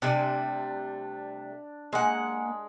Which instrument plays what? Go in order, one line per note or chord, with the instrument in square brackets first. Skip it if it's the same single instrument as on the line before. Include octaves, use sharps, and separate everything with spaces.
[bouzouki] C3 G3 A3 [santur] D4
[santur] G#3 [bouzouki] A#3 F#5